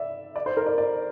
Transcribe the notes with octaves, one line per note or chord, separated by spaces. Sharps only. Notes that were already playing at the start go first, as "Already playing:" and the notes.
Already playing: D5 E5
D5
C5
A#4
D5
D5